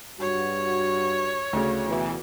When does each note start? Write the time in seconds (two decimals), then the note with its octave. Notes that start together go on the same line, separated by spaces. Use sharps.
0.20 G2 F#4 C#5
1.53 D2 C#3
1.88 B2 E3